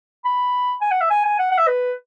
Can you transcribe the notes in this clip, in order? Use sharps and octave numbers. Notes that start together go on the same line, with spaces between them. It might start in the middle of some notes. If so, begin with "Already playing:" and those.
B5
G#5
F#5
E5
G#5
G#5
F#5
F#5
E5
B4